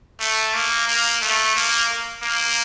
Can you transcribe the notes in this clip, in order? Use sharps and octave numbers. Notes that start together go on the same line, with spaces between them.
A3
A#3
A#3
A3
A#3
A#3